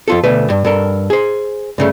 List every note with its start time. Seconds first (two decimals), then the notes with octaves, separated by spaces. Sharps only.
0.08 F2 F4 A4
0.24 D2 B2 A3 B4
0.50 G2
0.65 G2 A4 A#4
1.10 G#4 C5
1.78 G2 C#3 A3